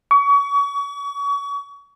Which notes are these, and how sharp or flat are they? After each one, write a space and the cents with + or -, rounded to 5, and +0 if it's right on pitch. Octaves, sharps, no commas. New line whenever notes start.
C#6 +35